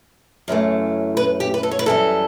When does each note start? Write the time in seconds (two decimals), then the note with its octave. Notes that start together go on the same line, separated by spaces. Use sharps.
0.48 F#2 C#3 E3 A3
1.17 B4
1.40 G4
1.54 B4
1.63 A4
1.71 C#5
1.79 B4
1.86 F#2 E3 G3 A4